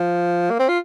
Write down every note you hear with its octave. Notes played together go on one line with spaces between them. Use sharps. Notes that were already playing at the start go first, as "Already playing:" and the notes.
Already playing: F3
A#3
C4
F4